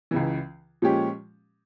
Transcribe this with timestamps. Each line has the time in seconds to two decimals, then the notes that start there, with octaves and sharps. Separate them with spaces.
0.11 C#2 C#3 E3
0.82 A#2 F3 G#3 C#4 G4